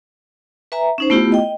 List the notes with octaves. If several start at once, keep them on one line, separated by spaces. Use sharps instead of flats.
B4 E5 G#5 A#5
C#4 D#4 C5
A3 B3 E4 F4 G4
D#5 G5